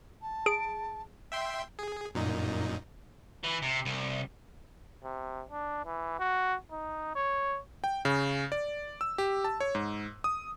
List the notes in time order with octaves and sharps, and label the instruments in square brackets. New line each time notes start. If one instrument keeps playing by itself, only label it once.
[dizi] A5
[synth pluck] G#4 D7
[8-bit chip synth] E5 G5 C6
G#4
F#2 A#2 D#4
[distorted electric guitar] E3
C3
C2
[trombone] C3
D4
E3
F#4
D#4
C#5
[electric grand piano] G5
C#3
D5
E6
G4
A5
C#5
G#2
D#6